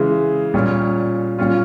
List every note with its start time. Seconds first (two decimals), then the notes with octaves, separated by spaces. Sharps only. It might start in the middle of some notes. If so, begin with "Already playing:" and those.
Already playing: C#3 E3 G#3
0.54 A#2 G3 C#4 F4
1.39 A#2 G3 C#4 F4